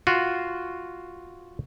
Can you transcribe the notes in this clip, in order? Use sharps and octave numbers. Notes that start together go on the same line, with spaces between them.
F4 F#4